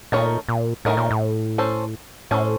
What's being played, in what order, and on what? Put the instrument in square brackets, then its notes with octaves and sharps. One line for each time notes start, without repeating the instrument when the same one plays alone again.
[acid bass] A#2 [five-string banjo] D#3 A3 D#4 A#4 C#5
[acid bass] A#2
[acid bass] A2 [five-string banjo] D#3 A3 D#4 A#4 C#5
[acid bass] A#2
A2
[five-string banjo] C#4 A4 C5
[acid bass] A2 [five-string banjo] C#4 A4 C5